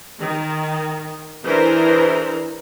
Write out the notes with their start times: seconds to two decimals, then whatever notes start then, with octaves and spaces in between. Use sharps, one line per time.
0.20 D#3
1.44 E3 D4 G#4 A#4 C5